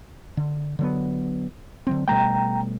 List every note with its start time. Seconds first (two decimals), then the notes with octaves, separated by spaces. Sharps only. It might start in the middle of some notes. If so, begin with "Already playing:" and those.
0.37 D3
0.79 D3 F#3 B3
1.87 D3 F#3 C4
2.08 B2 G3 A3 G5 A#5